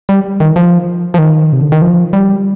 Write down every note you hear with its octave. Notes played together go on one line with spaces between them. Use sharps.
G3
D#3
F3
F3
D#3
C3
D3
D#3
F3
G3